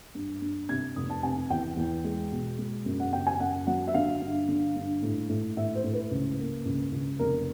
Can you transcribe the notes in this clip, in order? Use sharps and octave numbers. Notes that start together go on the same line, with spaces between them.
G2
G2
C3 G#6
F1 D#6
A5
C3 G#5
E2 G5
E2
G#3
B2
G#3
F#2
F#5
C#3 G5
G#5
F#2 F#5
F#3 F#5
E5
D3 F5
G2
D3
G2
A2
A2
A2 E5
C5
A2
B4
C#2
A#3
C#2
C#2
F1 A#4